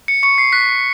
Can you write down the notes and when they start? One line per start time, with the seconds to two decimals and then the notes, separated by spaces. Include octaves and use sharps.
0.08 C#7
0.23 C#6 C#7
0.38 C7
0.53 F#6 B6